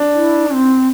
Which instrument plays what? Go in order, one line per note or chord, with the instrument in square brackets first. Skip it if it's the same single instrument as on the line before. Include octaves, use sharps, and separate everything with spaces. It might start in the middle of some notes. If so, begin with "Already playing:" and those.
Already playing: [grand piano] D4
[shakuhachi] E4
C4